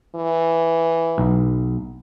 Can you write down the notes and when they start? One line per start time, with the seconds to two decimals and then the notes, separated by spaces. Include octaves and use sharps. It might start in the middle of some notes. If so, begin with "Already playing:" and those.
0.15 E3
1.18 B1